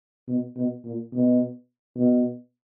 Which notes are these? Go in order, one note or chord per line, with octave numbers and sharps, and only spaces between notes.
B2
B2
A#2
B2
B2